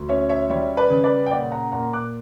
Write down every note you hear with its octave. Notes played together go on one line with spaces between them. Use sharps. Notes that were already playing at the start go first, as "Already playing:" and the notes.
Already playing: D2
C#4 C#5 E5
C#5 E5
G3 C#5 E5
B4 D5
C#3
B4 D5
G5
A#2 D5 F#5
F#5 A#5
A#2 F#5 A#5
D6 F#6